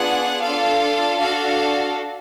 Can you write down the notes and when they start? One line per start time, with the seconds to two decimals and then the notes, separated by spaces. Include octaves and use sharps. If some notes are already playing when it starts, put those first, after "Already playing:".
Already playing: B3 D4 F4 G#4 F#5
0.42 D4 F4 A4 F5
1.19 D4 F#4 A4 F5